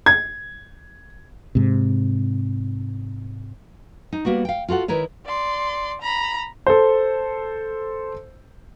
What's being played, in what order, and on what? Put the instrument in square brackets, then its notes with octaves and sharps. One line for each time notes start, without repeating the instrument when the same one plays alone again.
[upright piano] G#6
[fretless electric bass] G#2 C3
[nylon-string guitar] D#4
G3 A#3 B3 F#4
F5 G5
F4 F#4 A4 F#5
D#3 E4 A#4 B4 C#5
[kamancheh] D5 C6
A#5 B5
[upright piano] A4 C5